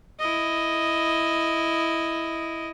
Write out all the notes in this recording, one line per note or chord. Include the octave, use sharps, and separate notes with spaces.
E4 D#5